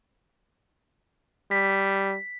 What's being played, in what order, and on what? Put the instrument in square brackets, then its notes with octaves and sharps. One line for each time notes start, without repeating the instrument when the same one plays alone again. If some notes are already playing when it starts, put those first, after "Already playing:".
[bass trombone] G3 [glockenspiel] B6